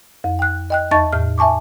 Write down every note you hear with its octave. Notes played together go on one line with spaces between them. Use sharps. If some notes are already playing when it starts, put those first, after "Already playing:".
F2
G5 F#6
D#5 G5 F#6
E2 D#4 D#5 A5 C#6 A6
E2 A2 F6
E5 G#5 A5 C#6 D6